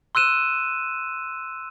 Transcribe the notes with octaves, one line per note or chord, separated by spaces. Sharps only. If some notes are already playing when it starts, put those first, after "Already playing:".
C6 E6 F#6 D#7 E7